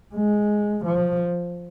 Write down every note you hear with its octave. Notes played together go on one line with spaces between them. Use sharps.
G#3
F3